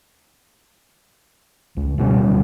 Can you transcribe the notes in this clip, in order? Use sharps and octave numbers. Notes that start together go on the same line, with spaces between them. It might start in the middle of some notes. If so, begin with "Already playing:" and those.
C#2
D1 B2 G3 C#4